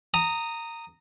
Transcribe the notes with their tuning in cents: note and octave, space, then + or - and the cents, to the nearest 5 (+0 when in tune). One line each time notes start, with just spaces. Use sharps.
A#5 -15 D#6 +0